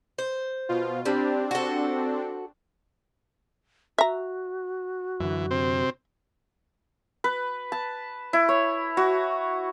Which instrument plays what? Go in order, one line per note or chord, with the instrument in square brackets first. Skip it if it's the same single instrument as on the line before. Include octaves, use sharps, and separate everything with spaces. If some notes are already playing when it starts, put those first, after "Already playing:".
[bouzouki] C5
[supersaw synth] B2 F4
[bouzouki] G3 [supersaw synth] C4 D4
[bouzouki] F#4 A4
[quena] F#4 [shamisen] E5 A#5
[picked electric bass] F#2 D3 [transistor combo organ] E3
[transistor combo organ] C3 C4
[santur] B4
A5
E4
C#5
F#4